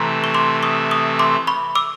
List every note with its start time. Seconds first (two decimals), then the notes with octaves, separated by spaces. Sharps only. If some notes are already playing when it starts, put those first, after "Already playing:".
Already playing: C3 E3 A3 A#5 C6
0.24 C#6
0.35 C6 D6
0.63 C#6 D#6
0.91 C#6 D#6
1.19 C6 D6
1.47 B5 C#6
1.75 D6 E6